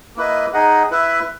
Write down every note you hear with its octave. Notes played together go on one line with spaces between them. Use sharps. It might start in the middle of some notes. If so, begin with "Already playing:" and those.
A#3 E4 B4 D#5
D#4 G#4 D#5 F#5
E4 B4 E5